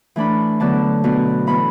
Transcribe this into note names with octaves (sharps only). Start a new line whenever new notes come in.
E3 A3 D4 B5
D3 F#3 B3 D4 A5
B2 B3 D4
A2 E3 B3 B5